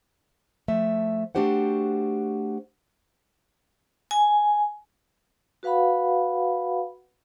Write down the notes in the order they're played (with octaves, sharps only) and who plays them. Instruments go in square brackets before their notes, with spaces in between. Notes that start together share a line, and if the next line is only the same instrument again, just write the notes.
[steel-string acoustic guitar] F3 A3 E5
A3 D4 F#4 G4 C5 F#5
[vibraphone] G#5
F#4 B4 F5 F#5 B5